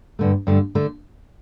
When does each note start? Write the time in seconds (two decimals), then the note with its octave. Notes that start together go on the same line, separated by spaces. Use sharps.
0.19 G2 D3 A3
0.47 G2 D3 A3
0.75 D3 A3